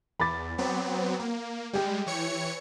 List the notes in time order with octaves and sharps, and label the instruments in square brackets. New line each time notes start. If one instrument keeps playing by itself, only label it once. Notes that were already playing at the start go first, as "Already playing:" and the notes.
[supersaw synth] E2 [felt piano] B5 D6 A6
[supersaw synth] F#3 B3 C4
A#3
[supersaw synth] G3 G#3 [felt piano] G4 G5
[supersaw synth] E3 C#5 C#7